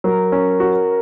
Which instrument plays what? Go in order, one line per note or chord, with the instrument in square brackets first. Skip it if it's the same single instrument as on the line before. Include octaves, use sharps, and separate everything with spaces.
[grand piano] F#3 [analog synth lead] A#4
[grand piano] C#4
F#4